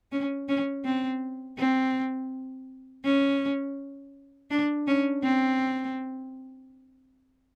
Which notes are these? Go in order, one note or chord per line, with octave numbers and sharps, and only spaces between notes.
C#4
C#4
C4
C4
C#4
D4
C#4
C4